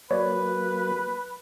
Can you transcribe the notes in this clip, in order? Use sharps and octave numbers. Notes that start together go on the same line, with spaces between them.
F#3 A#3 B4 C#5 D5